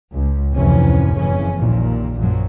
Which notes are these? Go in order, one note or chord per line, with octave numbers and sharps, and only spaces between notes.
C#2
F1 D2 A2 C3 E3 C#4
F#1 F2 C#3 E3 C#4
A#1 D#2 A#2
A#1 F#2 A#2 F3 F#3